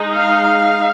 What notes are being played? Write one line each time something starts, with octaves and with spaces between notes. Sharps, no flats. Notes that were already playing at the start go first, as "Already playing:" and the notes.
Already playing: G#3 D#4
F5